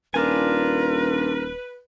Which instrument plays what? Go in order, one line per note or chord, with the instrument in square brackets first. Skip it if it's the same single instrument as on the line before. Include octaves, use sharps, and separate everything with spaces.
[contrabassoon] D#1 [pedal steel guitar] D4 F4 G#5 [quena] A#4 [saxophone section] B4